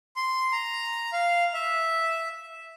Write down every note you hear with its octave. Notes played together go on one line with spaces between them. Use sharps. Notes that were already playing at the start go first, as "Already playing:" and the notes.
C6
A#5
F5
E5